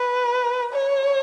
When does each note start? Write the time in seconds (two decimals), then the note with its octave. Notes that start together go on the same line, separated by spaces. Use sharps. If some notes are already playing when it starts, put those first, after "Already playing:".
Already playing: B4
0.72 C#5